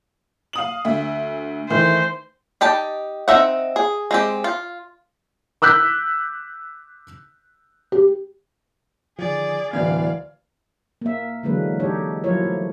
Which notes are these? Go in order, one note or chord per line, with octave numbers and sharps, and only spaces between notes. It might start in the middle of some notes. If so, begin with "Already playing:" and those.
F5 D#6 F#7
D2 E5
D#3 E3 A3 C5
D#4 G4 G5 A5
C4 D#4 E5 F#5
G#4
G#3 C4 G4
F4
D6 E6 F#6 G6 B6
G4
D3 D#3 F3 G#4 D5
D1 G1 E3 B3 D5 F5 G#6
A#3 E5
D3 E3 F#3 G#3 A#3 B4
D#4 G4 A4 C#5
F3 F#3 E4 F4 A#4 C#5
A3